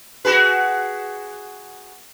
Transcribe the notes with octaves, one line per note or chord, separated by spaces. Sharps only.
F#4 G#4 B4